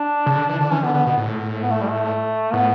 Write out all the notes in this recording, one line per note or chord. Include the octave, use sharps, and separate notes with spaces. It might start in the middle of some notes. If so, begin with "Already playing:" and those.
Already playing: D4
C#3
D3
E3
D3
E3 C#4
D3 B3
D3 B3
B2 B3
A2
B3
A3
G3
A3
A2 B3